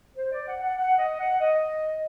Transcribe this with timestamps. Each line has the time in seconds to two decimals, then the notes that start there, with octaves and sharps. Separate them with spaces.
0.17 C5
0.32 D5
0.48 F#5
0.63 F#5
0.78 F#5
0.99 D#5
1.20 F#5
1.40 D#5